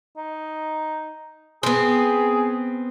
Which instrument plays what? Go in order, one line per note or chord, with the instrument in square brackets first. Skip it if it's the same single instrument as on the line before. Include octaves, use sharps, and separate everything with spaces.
[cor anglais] D#4
[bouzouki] B3 C4 [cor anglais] G#4